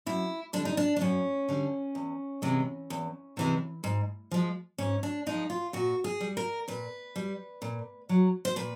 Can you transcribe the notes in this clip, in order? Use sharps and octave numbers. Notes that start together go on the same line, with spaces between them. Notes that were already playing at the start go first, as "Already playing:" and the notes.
F#2 E4
D3 G3 D4
D#4
D4
D4
F#2 C#4
D3 G3
E2
C3 E3 G#3
E2
C3 E3 G#3
G#2
F3 G#3
G#2 C#4
D4
F3 G#3 D#4
F4
A#2 F#4
G#4
G3
A#4
A#2 B4
G3
A#2
F#3
C5
A#2 B4